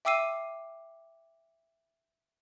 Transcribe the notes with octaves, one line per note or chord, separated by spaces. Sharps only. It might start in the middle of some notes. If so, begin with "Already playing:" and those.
E5 G5 D6 E6 C7 D#7